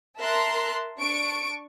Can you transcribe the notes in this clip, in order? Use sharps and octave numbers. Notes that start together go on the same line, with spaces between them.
A#4 E5 A5 A#5 C6 F#6
D4 C#6 D7